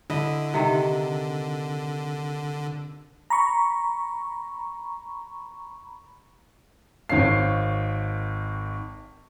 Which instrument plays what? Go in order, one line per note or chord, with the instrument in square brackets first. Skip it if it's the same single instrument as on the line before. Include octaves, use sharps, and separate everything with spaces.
[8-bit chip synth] D3 [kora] E4 D#5
[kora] C3 D#3
[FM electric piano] A#5 B5 C#6
[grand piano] G#1 D#3 C#5 F5 C7